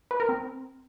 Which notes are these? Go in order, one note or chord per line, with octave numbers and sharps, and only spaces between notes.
B4
A#4
C4